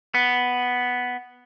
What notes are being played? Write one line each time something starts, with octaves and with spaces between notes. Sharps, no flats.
B3